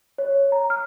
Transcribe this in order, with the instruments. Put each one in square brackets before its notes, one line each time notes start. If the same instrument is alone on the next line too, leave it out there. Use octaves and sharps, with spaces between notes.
[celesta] C#5
A#5
F6